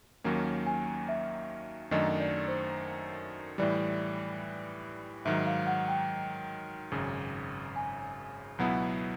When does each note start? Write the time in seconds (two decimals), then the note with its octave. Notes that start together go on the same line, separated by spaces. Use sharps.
0.24 D#2 D#3 F#3 A#3 C#4
0.66 G#5
1.09 E5
1.91 F#2 D#3 F#3 A3 D4 D#5
2.20 D5
2.48 C5
3.58 A2 E3 G3 D5
5.25 G#2 D#3 F#3 E5
5.46 F5
5.67 F#5
5.88 G5
6.92 G#1 F#2 C#3
7.76 G#5
8.58 C#2 B2 F#3 B3 E4 F#5